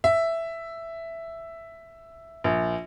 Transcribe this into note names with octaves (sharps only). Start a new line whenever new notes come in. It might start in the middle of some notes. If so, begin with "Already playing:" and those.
E5
A#1